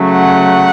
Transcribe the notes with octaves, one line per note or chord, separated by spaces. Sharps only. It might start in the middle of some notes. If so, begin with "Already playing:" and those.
Already playing: C#3 F#3 A3
F#5